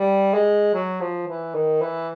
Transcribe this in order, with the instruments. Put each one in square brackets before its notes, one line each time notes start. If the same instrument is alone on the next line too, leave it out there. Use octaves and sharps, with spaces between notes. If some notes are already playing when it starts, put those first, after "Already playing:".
Already playing: [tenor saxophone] G3
G#3
F#3
F3
E3
D#3
E3